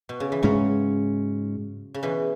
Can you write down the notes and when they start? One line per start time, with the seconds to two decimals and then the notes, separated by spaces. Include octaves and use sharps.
0.09 B2
0.20 C#3
0.32 E3
0.43 G#2 C#3 F#3 G#3 C#4
1.94 C#3
2.03 B2 E3